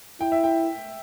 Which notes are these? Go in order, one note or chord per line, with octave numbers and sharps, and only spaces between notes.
E4 G5
E5
G5